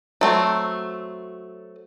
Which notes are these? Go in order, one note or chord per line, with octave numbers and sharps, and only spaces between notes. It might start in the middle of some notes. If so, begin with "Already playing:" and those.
F#3 A3 C4